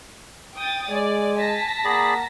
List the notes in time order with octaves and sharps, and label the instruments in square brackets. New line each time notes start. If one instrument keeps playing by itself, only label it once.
[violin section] G5 D#6 A6
[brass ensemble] G#3 [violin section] D5 [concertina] G#5
[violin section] A5 A#6 B6
[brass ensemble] A#3 F#5 A#5 [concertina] G#4 D5 B5